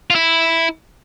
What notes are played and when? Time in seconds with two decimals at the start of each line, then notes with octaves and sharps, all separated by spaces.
0.10 F4
0.15 E4